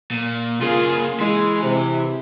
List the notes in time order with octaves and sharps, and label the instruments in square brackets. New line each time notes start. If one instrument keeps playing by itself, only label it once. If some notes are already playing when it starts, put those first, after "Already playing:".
[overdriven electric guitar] A#2
[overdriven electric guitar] C#3 A#3 [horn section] F4 G#4
[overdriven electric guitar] E3 [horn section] G#3
[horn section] C3